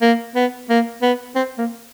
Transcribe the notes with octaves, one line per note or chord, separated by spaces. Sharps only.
A#3
B3
A#3
B3
C4
A#3